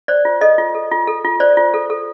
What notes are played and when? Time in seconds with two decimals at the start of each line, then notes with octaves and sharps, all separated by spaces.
0.08 C5 D5
0.25 F4
0.41 A4 D#5
0.58 F4
0.74 A4
0.92 F4
1.07 A4
1.25 F4
1.40 C5 D5
1.57 F4
1.74 A4
1.90 A4